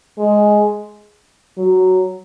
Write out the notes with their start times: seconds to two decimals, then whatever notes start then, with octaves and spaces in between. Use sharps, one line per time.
0.19 G#3
1.58 F#3